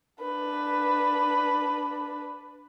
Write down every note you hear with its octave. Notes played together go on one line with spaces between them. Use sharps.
D4 B4